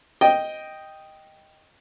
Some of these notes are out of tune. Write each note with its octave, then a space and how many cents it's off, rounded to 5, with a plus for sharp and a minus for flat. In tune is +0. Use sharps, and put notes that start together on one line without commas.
D#5 +0 G5 +0